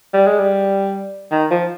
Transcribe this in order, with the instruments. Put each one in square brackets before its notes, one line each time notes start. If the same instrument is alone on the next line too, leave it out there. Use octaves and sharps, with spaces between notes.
[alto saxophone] G3
G#3
G3
D#3
F3